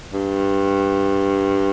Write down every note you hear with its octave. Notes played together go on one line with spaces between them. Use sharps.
G2